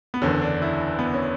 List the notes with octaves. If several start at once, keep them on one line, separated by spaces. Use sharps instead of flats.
B3
F#1 E2 D3 C#4
D4
E4
B3
C#4